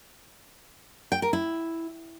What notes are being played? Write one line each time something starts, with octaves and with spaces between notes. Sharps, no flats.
G5
A#4
E4